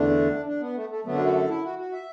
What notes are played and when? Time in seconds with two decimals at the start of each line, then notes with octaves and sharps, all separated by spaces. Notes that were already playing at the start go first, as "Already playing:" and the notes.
Already playing: E2 D3 A3 D4
0.46 D4
0.60 B3
0.76 A3
0.90 A3
1.04 F#2 D3 F#3 A3 B3
1.14 D4
1.25 F#4
1.34 A4
1.48 E4
1.63 F#4
1.79 F#4
1.93 E5